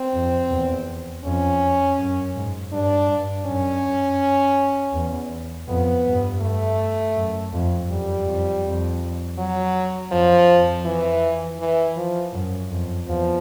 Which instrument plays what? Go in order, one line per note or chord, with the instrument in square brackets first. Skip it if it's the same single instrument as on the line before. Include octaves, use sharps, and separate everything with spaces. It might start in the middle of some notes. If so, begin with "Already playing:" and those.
Already playing: [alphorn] C4
[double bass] F2
E2
[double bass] F2 [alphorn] C#4
[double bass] F#2
G#2
[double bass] G2 [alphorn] D4
[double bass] G2
[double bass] F#2 [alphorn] C#4
[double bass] E2
[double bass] F2 [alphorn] B3
[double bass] G2
[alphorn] A3
[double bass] F#2
F2
[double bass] F#2 [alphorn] G3
[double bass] F2
F2
[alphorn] F#3
[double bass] F2 [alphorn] F3
[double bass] F2
[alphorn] E3
E3
F3
[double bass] F#2
F2
[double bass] E2 [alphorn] F3